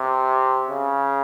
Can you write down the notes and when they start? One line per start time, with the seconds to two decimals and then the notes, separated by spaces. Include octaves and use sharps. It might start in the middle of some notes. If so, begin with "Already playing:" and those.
Already playing: C3
0.70 C#3